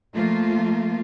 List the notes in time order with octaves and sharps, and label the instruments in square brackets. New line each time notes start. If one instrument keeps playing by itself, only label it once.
[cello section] F3 A3 A#3 F4